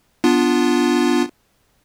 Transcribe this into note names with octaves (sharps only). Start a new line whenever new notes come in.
B3 D4 F4